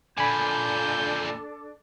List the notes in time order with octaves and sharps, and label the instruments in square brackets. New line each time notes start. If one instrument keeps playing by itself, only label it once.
[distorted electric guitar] A#2 D3 [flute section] D4 A4 D6 [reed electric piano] G#5 B5 [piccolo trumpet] G6